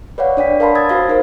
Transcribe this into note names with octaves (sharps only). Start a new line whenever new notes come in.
B4 C#5 D5 F5 F#5
D4 D5 G5 B6
A#4 F5 A5 B5 C6
A5 D#6 E6 G#6 A6
F#4 C5 F5
D#4 A#4 C5